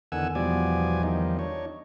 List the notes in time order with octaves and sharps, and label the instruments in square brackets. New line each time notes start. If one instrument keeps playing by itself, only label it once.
[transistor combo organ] E2 D3 D#3 F#5 G#5 E6
E2 B2 F3 G3 D5 G#5
E2 D#3 F3 G3 D#4
D4 D#4 C#5